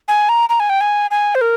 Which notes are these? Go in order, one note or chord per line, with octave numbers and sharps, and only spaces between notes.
G#5
A#5
A#5
G#5
G5
G#5
G#5
C5
A#4